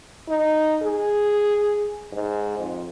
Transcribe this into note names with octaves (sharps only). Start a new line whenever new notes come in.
D#4
G#4
G#2
F2